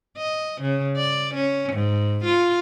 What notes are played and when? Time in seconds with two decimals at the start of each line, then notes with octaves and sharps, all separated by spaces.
0.17 D#5
0.62 C#3
0.97 D5
1.34 C#4
1.73 G#2
2.25 F4